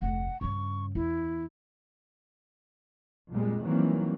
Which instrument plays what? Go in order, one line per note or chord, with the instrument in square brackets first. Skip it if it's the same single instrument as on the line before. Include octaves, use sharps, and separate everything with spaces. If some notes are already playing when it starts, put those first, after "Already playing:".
[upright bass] F1 D2 [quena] F#5
[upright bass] G2 C#3 [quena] C#6
[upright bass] E2 [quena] E4
[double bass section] F2 A#2 G3 G#3
D#3 E3 F#3 G3 A#3 C4